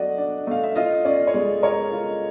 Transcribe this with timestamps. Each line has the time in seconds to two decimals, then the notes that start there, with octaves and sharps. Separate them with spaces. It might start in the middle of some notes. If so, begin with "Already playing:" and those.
Already playing: F#3 A3 F#4 D5 D#5
0.18 D4
0.47 A3 F5
0.64 E5
0.76 F4 D#5
1.05 C#4 D5
1.27 C#5
1.33 G#3 D5
1.63 A#4 C#5
1.91 F4